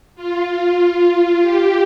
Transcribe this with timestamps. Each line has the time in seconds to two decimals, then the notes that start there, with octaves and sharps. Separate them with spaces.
0.16 F4
1.41 G4